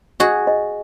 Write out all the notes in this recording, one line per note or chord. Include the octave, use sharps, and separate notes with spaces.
F#4 G#4 D#5
D#5